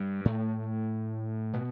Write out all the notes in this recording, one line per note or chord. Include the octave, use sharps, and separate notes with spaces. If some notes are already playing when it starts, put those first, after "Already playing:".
Already playing: G2 G3
A2 A3
B2 B3